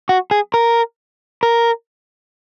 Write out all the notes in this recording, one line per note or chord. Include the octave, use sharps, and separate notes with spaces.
F#4
G#4
A#4
A#4